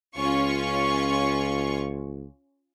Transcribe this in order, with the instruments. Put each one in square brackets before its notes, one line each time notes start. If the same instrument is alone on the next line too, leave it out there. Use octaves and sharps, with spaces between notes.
[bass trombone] C#2 [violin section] C#4 F4 C#6